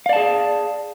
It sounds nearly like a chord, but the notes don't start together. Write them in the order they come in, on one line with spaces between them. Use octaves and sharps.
F5 D5 A5 G#4